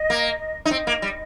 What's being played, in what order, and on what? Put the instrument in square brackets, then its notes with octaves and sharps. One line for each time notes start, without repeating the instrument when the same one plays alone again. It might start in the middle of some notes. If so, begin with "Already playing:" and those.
Already playing: [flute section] D#5
[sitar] A#3
D#4
[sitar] C4 [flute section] D#5
[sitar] A#3
G3